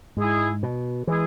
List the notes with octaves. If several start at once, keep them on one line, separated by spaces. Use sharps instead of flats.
G#2 G#3 E4 G#4
B2
E3 G#3 E4 G#4